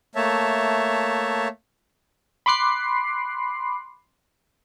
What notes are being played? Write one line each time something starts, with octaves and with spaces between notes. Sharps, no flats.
A3 A#3 C#5 E5 A5
B5 C6 D6 F#6 C7